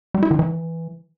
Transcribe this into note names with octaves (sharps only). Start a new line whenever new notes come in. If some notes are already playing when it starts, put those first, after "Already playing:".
G3
E4
D#3
E3